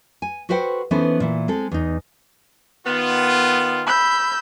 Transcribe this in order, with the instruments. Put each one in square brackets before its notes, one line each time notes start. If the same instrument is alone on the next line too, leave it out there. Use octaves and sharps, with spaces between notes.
[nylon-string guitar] G#5
F#4 A4 B4 C5 F#5 G5
E3 B3 C#4 D#4 A4 C5
A#2 E3
G#3 C4 A4
E2 D#4
[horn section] D#3 B3 F4
[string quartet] B5 E6 G6